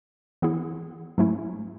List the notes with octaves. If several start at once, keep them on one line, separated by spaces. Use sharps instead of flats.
E3 B3 E4 G#4
G#2 F#3 A3 C#4 E4